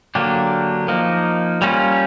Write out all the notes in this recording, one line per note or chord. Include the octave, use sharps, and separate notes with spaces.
D3 F#3 A#3 D4 G4
F3 A#3 D#4
G3 A#3 C#4 F4